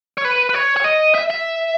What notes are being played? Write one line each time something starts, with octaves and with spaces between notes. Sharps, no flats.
C#5
B4
B4
C#5
C#5
D#5
E5
E5